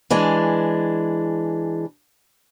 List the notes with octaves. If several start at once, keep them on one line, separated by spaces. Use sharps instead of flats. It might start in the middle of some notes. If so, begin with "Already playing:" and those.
E3 G#3 D4